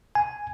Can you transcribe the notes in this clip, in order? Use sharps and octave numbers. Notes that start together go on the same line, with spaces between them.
G#5